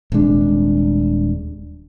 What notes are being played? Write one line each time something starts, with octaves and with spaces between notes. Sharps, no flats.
D#1 C3 G#3 D4